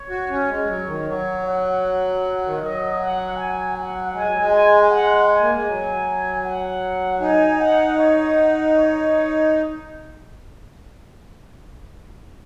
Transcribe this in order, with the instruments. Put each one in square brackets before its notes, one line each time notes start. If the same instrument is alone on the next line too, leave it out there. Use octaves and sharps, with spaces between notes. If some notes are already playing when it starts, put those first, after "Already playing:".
Already playing: [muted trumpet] C#5
[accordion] F#4
C#4
G#3
F#3
D#3
[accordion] F#3 [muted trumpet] C#5
[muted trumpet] F#5
[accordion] D#3
[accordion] F#3 [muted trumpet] D#5
[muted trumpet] F#5
G#5
F#5
[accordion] G#3 [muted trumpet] G#5
[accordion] F#3
G#3
[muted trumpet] G#5
F#5
G#5
[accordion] A#3
G#3
F#3
[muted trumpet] F#5
[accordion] D#4 [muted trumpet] G#5
[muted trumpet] F#5
C#5
F#5
C#5